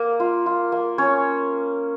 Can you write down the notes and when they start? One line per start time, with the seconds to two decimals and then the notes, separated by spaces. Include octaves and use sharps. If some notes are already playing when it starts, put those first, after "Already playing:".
Already playing: A#3
0.20 F4
0.46 F4
0.72 A#3
0.98 C#4 C#5